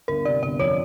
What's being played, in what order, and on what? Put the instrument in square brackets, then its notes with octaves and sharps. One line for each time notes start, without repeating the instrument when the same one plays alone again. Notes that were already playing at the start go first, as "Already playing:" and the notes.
[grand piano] G1 [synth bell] A#4
[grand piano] C3 [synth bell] D5
[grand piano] G1 [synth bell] D5
[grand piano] F2 [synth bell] C#5